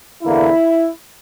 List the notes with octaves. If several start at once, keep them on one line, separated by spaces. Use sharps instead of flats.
E2 D3 A#3 E4